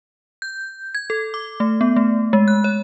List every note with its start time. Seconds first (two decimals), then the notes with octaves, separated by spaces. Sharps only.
0.42 G6
0.95 G#6
1.10 A4
1.34 D6
1.60 A3
1.81 B3
1.96 A3
2.33 G#3
2.48 F#6
2.64 C#5